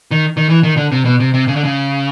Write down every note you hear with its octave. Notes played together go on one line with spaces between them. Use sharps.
D#3
D#3
E3
D#3
D3
C3
B2
C3
C3
C#3
D3
C#3